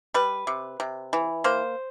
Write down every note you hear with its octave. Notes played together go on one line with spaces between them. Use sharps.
G3 B4
C3
C3
E3
A#3 C5